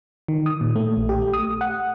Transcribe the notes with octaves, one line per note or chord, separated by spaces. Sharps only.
D#3
D#6
A#2
A3
A#1
G4
A3
D#6
F#5